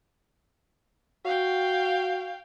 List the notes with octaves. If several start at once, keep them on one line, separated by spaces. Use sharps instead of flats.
F#4 F5 G5